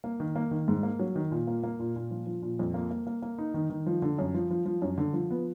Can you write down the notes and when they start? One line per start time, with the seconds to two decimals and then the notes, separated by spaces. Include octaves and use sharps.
0.04 A#3
0.20 D#3
0.36 A#3
0.51 D#3
0.68 G#2
0.83 A#3
0.99 F#3
1.16 D#3
1.31 A#2
1.47 A#3
1.63 A#3
1.79 A#2
1.96 A#2
2.11 F3
2.26 F3
2.42 A#2
2.59 F2
2.74 A#3
2.91 A#3
3.07 A#3
3.22 A#3
3.38 D#4
3.54 D#3
3.70 D#3
3.86 F3
4.02 D3
4.18 F#2
4.34 F3
4.50 F3
4.66 F3
4.82 F#2
4.98 D3
5.13 F3
5.31 B3